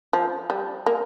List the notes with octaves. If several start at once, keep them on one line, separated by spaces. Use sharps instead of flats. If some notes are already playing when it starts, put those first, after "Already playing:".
F3
G3
A#3